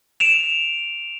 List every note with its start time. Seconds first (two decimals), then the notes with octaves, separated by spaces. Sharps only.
0.20 D7 E7 F7